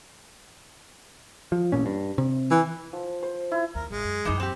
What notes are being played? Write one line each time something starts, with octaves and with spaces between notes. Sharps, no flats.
F3
A1 A#2 C#4
G2
C3
E3
F3
C5
E4
D#2 A#4
A1 G#3
F#2
F#2 A#2 E3 D#4 D#5
C4 G4